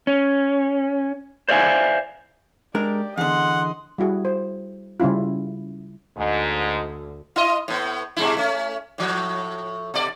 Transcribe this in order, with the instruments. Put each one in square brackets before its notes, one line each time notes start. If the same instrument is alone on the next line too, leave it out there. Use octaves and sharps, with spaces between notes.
[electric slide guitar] C#4
C5 D5 E5 F5 G#5
[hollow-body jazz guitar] G#3 D4 A#4 [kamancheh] G4 D5
[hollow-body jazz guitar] E2 D3 [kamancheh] D#5 C6 [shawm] F#5
[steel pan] G3 E4 F#4 G#4
C5
C#3 G3 C#4 E4 F4
[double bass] D2 [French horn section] G#2
[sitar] E4 D#5
A2 B3
B2 G#3 E4
A3 C#4
A2 F3
B2 D5